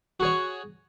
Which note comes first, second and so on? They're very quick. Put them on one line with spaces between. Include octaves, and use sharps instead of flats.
F#4 G#4 C#5